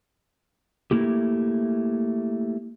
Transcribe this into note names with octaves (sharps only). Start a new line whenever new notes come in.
A3 A#3 E4 G4